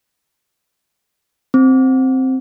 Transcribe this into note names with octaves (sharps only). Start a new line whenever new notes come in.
C4